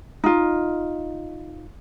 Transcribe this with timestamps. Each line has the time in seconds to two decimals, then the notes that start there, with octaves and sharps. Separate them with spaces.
0.24 D#4 F4